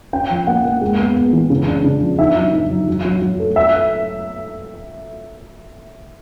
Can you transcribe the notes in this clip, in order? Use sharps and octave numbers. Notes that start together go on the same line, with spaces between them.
C#4 G5
F3
A#3 F#5
A#3
G#3
B3
B3
E3
C#3
D4
C#3
F3
D#4 E5
F#3
D#4
F#3
F#3
F#3
F#3
A3
E5